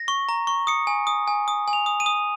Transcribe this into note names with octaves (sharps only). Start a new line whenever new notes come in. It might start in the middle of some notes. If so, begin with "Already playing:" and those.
Already playing: A#6
C#6
A#5
C#6
D#6 C#7
G#5
D#6
G#5
D#6
G#5
F7
D#6
D#7
D#6